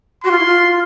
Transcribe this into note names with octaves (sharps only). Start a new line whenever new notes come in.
F#4 C6
F4
E4
F4